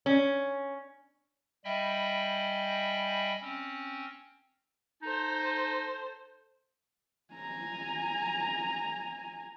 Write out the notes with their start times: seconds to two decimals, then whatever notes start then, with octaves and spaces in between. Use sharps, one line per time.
0.06 C#4
1.64 G3 D#5 E5 G5 G#5 B5
3.41 C4 C#4
5.03 D#4 A4 C5
7.34 G#5 A#5